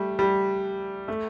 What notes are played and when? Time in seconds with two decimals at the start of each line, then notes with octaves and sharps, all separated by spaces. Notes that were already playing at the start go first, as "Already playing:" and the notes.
Already playing: G3 A3
0.19 G3
1.08 A3